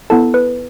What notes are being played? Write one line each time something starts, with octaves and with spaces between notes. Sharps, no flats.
B3 E4 A4 A5
B4